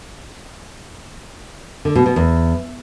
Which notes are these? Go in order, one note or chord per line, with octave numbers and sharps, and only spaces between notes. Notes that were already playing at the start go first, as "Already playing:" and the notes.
D3
B2
B2
E2